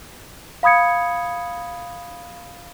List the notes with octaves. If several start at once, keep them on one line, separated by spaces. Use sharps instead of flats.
F5 B5 D#6 G#6 C#7